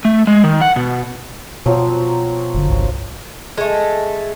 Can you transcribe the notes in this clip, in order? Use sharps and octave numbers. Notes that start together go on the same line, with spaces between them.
A3
G#3
D#3
F#5
B2
B2 F3 F#3 C4
F#1 D3
G1 C2 G2
G#3 A3